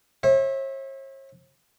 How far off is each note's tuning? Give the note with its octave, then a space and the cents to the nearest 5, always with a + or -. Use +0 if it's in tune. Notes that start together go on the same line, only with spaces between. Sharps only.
C#5 -45 E5 -15